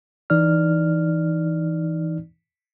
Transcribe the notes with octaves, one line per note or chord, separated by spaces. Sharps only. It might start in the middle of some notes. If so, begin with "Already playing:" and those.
E3 D#4 D5 F6